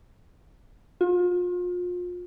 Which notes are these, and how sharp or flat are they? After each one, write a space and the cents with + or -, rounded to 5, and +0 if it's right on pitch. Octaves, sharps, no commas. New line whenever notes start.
F4 +35